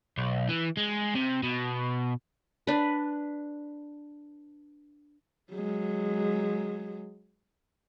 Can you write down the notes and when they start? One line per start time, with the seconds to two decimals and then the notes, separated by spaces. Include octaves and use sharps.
0.17 B1
0.49 E3
0.77 G#3
1.15 C3
1.43 B2
2.67 D4 B4
5.53 F#3 G#3